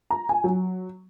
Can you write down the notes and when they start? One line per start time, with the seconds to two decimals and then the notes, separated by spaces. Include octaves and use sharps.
0.10 A#5
0.29 G#5
0.44 F#3